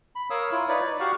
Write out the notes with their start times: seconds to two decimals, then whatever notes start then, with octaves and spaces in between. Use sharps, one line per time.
0.16 B5
0.30 A#4 C#5 F5 D#6 E6
0.52 E4 F4
0.69 D#4 B4 C#5 D5
0.86 D5
1.00 F#4 G4 F5 F#5 C#6 F6